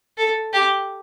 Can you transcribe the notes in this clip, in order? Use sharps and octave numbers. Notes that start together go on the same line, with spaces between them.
A4
G4